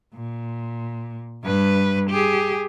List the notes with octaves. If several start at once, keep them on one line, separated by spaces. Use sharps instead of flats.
A#2
G2 B4
G4 G#4